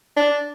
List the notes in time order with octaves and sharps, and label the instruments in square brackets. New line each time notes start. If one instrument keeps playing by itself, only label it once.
[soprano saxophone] D4